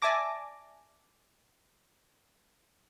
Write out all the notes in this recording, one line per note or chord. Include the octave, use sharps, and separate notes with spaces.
D5 E5 G#5 A5 D6 A#6